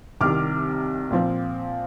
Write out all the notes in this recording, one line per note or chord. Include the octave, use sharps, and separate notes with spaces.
C2 C3 D#3 D6 F6
A#2 F3 C4